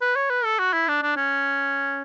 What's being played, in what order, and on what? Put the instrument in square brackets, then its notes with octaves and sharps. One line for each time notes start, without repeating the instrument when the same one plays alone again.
[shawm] B4
C#5
B4
A4
F#4
E4
D4
D4
C#4